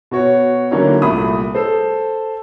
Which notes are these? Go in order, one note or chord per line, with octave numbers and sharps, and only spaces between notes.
B2 F#4 C#5
D3 F#3 A#3 C#4 D#4 E4
C2 A#2 A3 B5 D#6
A4 C5